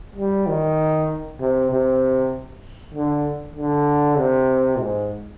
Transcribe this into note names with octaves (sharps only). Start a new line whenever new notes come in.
G3
D#3
C3
C3
D3
D3
C3
G#2